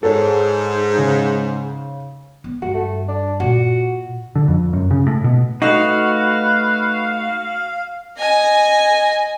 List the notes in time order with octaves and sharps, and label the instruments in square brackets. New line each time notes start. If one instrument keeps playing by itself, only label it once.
[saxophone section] G#2 [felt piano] A4 C#5
[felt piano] C#3
[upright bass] B3
[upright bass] G2 [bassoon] F#4
[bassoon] A3
D4
[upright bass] A#2 [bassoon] F#4
[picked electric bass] D3
F2
F#2
C#3
A2
B2
[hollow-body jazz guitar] A3 D#4 [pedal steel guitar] F#4 [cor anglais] B4 [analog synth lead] F5
[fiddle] D#5 G#5